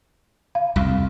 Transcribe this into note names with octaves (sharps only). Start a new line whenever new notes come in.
F5
C2 F2